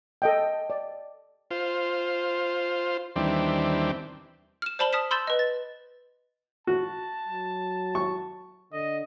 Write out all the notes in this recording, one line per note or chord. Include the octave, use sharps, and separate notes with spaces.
A4 D#5 G5
D5
F4 C5
D#2 E3 G3 C4 D4
F6 E7
C5 D5 A5 B5 F#7 G7
A5 D#6 F6 B6 E7
B5 C6 E6 G6 A6 E7
B4 D#5
A6
F#4 A5
F#3
C#6
D3 D#5